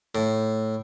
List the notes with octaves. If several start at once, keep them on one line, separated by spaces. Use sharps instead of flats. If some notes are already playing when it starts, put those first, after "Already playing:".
A2